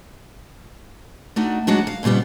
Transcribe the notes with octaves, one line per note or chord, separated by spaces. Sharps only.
A3 D4 D#4 F#4
F#3 G#3 D4 D#4 F#4 G#4
F5
F2 A#2 C#3 G3 B3